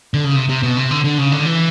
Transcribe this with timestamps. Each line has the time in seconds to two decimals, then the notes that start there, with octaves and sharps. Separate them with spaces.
0.14 D3
0.24 C#3
0.36 C3
0.49 C3
0.63 B2
0.77 C3
0.91 D3
1.04 D3
1.18 C#3
1.32 D3
1.39 D#3
1.46 E3